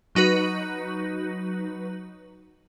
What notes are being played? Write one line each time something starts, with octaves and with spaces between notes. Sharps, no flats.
F#3 D#4 F#4 B4